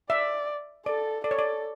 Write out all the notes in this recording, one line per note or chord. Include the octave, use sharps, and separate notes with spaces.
D5 E5
A4 D5
A4 D5
C#5
D5